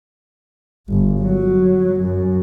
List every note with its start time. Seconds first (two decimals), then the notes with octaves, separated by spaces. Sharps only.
0.88 G1
1.21 F#3
2.01 F#2